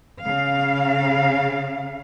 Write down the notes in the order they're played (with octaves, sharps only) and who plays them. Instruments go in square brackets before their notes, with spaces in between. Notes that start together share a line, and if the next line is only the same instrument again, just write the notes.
[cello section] C#3 F5